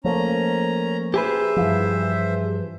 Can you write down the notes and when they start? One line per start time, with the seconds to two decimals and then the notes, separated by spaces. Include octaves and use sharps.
0.04 F3 A3 A#3 C#4 A#5
1.14 G4 G#4 B4 C5 E5
1.56 G2 E3 F3